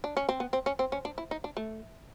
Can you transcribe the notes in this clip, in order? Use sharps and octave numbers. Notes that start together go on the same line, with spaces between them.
D4
C#4
C4
B3
C4
C#4
C4
C#4
D4
E4
D#4
D4
A3